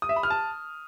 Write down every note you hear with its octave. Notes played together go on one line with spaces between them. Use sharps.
D#6
E5
B5
F6
A5